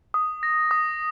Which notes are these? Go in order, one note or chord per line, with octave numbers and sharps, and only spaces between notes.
D#6
A#6
D#6